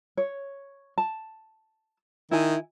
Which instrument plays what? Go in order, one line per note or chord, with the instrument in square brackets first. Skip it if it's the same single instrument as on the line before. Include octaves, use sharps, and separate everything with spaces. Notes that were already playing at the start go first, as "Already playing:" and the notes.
[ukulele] C#5
A5
[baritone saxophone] D#3 [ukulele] E4 G#5